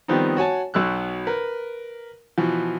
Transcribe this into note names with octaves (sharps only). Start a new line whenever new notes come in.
D#3 F3 G3 B3 C4 D#4
F#4 C#5 G#5 A5
B1 B2 F#3 E6 F#6
A#4 B4
B2 E3 F3